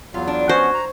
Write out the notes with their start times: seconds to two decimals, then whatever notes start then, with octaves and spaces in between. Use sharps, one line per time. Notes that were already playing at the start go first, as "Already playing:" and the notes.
0.14 E2 F#3 F4 F5
0.28 D4
0.49 F3 B3 C#4 F#4 C5 C#6 G#6 A#6
0.74 A#5